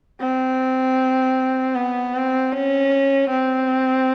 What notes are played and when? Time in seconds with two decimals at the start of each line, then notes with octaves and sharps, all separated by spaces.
0.20 C4
1.75 B3
2.15 C4
2.53 C#4
3.30 C4